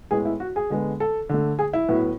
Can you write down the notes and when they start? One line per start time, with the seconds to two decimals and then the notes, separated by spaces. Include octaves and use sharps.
0.11 A2 G#3 B3 G#4
0.25 E4
0.40 F#4
0.56 G#4
0.70 D3 G#3 B3
1.00 A4
1.29 D3 A3
1.59 G#4
1.73 E4
1.88 A2 F#3 B3